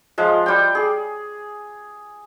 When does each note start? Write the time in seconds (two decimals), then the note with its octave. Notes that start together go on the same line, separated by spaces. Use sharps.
0.18 F3 G#3
0.46 G3 G5
0.75 G#4